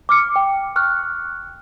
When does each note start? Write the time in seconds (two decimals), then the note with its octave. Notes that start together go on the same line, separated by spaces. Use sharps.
0.09 D6 F6 C#7
0.36 G5
0.76 C#6 F6 F#6